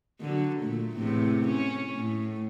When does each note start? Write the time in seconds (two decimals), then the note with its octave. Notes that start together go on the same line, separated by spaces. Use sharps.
0.21 D3 F#3
0.60 A#2 A3
0.97 E2 A2 C3
1.48 C#4
1.96 A2